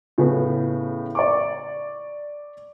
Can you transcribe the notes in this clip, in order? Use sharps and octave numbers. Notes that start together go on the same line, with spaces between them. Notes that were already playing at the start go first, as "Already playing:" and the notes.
A2 C#3 A3 B3
D5 C#6 D6